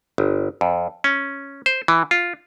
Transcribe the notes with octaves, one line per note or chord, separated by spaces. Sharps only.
G1
F2
C#4
C5
E3
F4